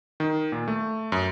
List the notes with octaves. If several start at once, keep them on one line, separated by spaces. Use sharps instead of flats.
D#3
A#2
A3
F#2